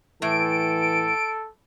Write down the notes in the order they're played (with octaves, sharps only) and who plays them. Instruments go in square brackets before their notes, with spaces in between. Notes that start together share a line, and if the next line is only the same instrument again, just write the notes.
[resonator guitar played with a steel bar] A2 [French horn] E3 [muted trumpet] A4 [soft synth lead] D7